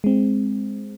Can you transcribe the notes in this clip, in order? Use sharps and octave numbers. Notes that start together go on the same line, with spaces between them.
G#3 C4